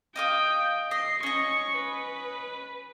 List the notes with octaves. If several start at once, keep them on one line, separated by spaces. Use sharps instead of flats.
D#5 F5 G5 D#6
D#5 C7
C#4 D#5 C#6
B4